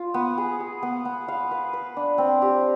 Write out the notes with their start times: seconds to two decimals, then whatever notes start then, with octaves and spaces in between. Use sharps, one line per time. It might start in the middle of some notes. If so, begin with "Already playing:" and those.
Already playing: F4
0.14 B3
0.38 G#4
0.60 G#4
0.83 B3
1.05 B3
1.28 F5
1.51 B4
1.73 B4
1.97 D4
2.18 C4
2.42 G4